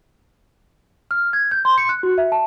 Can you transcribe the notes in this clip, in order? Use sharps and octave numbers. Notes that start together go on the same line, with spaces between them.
F6
G#6
G6
C6
C#7
F#6
F#4
E5
A5